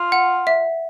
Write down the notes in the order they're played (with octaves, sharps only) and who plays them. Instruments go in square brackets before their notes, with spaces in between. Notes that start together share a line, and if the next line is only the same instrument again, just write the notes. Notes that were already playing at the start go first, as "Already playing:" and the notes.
Already playing: [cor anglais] F4
[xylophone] F#5
E5